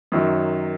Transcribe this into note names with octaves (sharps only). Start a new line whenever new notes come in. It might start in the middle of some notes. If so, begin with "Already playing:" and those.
F#2 D#3 F#3